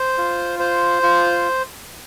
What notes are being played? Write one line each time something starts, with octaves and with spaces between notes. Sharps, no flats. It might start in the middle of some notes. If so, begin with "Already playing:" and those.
Already playing: C5
F4
C5
F4